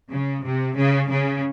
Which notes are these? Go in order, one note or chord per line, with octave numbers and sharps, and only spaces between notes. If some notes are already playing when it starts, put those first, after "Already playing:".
C#3
C3
C#3
C#3